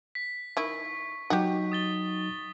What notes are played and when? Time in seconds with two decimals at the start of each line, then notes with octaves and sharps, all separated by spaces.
0.15 B6
0.57 D#3 E4 C#6
1.30 F#3 D#4 F#4 G4
1.72 D#6 A6 G7